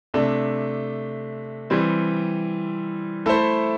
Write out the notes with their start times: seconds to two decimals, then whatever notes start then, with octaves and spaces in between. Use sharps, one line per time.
0.14 C3 A3 D4
1.70 E3 G3 C4
3.26 A3 E4 A4 C5